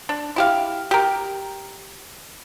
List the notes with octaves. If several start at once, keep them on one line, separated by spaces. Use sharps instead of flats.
D4
E4 G4 F5
G4 A#4